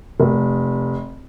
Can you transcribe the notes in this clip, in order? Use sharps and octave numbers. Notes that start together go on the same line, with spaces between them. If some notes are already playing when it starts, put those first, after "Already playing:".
F1